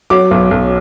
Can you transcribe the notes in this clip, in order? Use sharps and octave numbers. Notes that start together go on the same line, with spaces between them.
F#3 D6
B1
B1